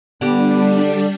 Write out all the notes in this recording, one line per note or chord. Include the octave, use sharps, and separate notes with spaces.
D3 G3 B3 D4 G4